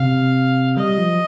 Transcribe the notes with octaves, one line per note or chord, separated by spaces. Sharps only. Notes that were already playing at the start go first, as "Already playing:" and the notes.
Already playing: C3 F5
G3 D#5
F3